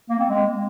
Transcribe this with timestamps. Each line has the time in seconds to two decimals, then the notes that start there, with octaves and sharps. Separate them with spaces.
0.10 A#3
0.20 C4
0.29 G#3